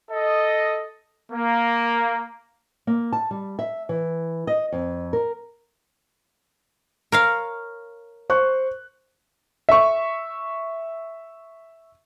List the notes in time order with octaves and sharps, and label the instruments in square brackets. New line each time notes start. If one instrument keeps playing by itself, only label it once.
[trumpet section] A4 D#5
A#3
[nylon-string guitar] A#3
A5
G3
E5
E3
D#5
F2
A#4
[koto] A#4 C#5 F5
[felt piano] C5 C#6 F#6
[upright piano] E5 C#6